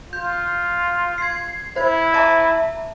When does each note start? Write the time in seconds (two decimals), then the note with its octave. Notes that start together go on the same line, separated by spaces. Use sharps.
0.13 F4 G6
1.18 G#6 C7
1.76 E4 C5 G#6
2.14 E5 A5 A#5